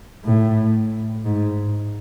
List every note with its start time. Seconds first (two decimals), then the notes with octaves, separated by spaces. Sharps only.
0.24 A2
1.24 G#2